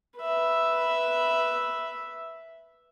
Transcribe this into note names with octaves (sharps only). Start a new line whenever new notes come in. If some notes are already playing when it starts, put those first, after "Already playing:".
B4 E5